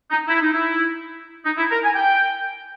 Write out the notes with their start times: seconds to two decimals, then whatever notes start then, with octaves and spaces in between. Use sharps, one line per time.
0.11 D#4
0.28 E4
0.41 D#4
0.54 E4
1.46 D#4
1.58 E4
1.71 A#4
1.84 G#5
1.96 G5